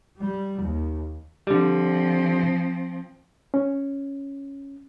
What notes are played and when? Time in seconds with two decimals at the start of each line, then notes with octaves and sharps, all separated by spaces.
0.19 G3
0.60 D#2
1.47 D3 F3 G3 C4
3.54 C#4